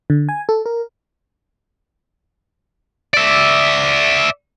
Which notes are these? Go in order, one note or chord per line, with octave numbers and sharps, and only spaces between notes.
D3
G#5
A4
A#4
D5 E5